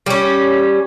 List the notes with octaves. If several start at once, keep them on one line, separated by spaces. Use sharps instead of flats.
G3 C#4